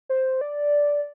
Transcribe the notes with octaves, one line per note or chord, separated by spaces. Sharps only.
C5
D5